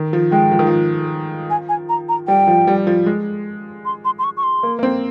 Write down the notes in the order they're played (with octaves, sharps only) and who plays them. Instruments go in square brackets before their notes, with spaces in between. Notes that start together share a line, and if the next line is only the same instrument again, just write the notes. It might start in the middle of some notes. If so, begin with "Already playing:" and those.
Already playing: [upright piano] D#3
F3
[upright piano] G#3 [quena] G5
[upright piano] F3
D#3
F3
[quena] G#5
G#5
A#5
A#5
[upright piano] G3 [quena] G5
[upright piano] F3
G3
F3
G#3
[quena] C6
C6
C6
C#6
C#6
C6
[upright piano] A#3
A#3
C4